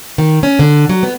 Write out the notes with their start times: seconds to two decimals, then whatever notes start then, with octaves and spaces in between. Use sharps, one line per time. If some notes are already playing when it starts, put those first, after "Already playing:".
0.18 D#3
0.43 C#4
0.59 D3
0.89 F#3
1.03 B3